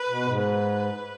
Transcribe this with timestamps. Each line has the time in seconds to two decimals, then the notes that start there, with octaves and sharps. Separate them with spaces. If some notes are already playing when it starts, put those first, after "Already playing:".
Already playing: B4
0.09 B2
0.26 G#2
0.43 B4